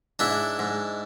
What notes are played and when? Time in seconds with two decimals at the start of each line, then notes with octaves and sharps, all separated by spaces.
0.19 G#2 D4 E4
0.59 G#2